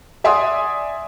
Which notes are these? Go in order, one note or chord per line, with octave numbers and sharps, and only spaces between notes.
D5 E5 F#5 G#5 C6 D#6